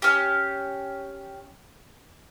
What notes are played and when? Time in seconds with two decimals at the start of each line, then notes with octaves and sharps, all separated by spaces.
0.02 C#4 G4